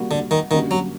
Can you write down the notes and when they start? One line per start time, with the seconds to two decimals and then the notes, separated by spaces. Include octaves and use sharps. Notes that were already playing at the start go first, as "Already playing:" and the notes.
Already playing: G3 A#3 F#4
0.11 D3
0.31 D#3
0.51 F#2 D3 D#3 G3 A#3 F#4
0.71 F#3